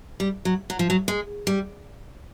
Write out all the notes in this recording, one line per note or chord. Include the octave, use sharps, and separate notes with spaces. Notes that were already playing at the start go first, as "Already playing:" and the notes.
G3
F#3
F#3
F3
F#3
G#3
G3